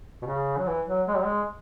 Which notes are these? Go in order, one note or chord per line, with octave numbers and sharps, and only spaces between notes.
B2
C#3
F#3
E3
F#3
G#3
F#3
G#3